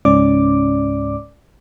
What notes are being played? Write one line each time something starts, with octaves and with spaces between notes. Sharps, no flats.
C#2 G#2 C#4 D5 D6